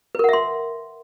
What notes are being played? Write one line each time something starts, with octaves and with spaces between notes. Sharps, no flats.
A#4 B4 E5 F#5 C6